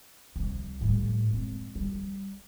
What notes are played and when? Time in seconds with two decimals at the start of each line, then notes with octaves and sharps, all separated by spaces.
0.36 C2 G3
0.81 A2 G3
1.31 G#3 C4
1.75 G3